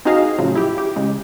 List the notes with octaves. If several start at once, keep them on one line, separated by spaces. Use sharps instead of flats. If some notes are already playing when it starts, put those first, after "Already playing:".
C4 D#4 F#4 G#4 D#5 F5
A2 C#3 F3 F#3
E4 G4
G4
C#3 G#3